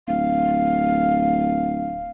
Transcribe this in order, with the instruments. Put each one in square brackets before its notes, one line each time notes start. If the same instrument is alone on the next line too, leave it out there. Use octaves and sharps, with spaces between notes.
[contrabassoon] D1 [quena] F5